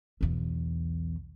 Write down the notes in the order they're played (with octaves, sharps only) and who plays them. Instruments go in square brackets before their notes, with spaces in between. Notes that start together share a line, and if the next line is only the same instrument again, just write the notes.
[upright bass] B1 E2